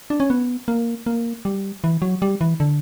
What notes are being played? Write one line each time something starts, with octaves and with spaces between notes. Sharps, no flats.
D4
C#4
B3
A#3
A#3
G3
E3
F#3
G3
E3
D3